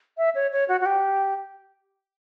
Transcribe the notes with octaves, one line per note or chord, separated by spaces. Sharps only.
E5
C#5
C#5
F#4
F#4
G4